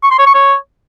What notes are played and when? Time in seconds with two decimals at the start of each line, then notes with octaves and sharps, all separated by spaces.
0.03 C#6
0.11 C6
0.18 C#5
0.26 C#6
0.34 C#5